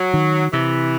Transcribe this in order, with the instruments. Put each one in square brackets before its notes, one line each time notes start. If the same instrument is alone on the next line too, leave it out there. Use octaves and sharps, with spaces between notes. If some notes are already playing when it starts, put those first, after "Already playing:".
Already playing: [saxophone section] F#3
[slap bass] D#3
[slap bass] C3 [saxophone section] E3